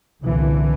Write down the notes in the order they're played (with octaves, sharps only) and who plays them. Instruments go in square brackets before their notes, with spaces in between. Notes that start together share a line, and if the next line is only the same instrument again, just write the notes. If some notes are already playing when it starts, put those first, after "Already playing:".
[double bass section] C2 A#2 D3 E3